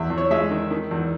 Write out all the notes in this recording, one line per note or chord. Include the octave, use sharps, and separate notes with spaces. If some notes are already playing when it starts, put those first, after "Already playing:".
Already playing: E2 E5
E2
C#5
G#3 E5
D#3
D#3
E2